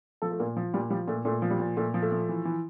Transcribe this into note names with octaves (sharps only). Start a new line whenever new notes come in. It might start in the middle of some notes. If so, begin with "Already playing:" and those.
F3 A4
A3
A#2 A#3
F3
A#2 G3
F3 G3
A#2 A3
A#2 A3
F3
G3
A#2
A#2 A3
F3
A3
F3
E3
E3